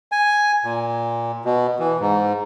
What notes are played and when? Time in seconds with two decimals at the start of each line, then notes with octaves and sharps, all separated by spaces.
0.12 G#5
0.65 A#2
1.45 B2
1.80 E3
2.00 G#2